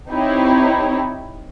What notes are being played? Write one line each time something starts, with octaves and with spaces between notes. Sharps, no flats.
C4 D#4 E4 G4 C#5